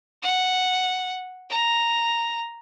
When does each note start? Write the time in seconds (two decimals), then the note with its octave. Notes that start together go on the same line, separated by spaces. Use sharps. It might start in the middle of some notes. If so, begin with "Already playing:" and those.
0.22 F#5
1.50 A#5